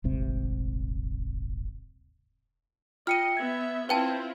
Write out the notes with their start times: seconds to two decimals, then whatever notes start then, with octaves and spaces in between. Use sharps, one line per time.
0.04 D#1 G#1 C3
3.07 F4 D#5 G5 F6 C#7 D#7
3.37 B3 E5 G#6
3.89 C4 E4 F4 B4 G5 A5